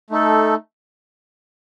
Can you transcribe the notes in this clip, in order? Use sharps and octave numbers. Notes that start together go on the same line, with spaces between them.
A3 D#4 A4